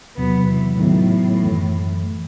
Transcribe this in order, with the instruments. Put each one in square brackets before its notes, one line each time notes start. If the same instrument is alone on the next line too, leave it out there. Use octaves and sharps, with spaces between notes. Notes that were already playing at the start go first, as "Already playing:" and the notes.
[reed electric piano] E2 C3 F#3 [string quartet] B3
[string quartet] E3
[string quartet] A2 [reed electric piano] D#3 F#3 B3 E4
[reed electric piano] F#2 E3 A3